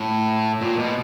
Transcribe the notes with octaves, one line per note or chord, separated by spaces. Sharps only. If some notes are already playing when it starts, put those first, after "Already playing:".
Already playing: A2
A#2
B2